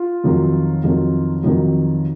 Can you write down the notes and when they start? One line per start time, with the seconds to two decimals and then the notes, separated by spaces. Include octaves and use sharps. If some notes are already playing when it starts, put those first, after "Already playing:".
Already playing: F4
0.24 F2 D#3 F#3
0.84 F2 D#3 F#3
1.44 F2 D#3 F#3